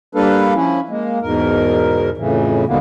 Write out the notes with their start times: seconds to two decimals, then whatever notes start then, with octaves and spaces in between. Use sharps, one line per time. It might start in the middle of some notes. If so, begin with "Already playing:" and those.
0.15 G3 A#3 D4 A4 B4 F5
0.55 F3 C#4 E4
0.89 G#3 A#3
1.22 E2 G#2 B2 A#4
2.17 F2 A2 C#3 E3
2.67 D#2 G#2 B2 D3 A#3 B3